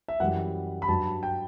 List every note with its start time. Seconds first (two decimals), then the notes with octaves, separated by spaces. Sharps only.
0.08 E5
0.20 F#2 E3 G3 F#5
0.82 B5
0.88 G2 F#3 A5
1.23 G5